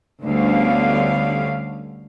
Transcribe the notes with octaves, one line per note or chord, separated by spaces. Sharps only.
D2 D3 G3 B3 C#4 F5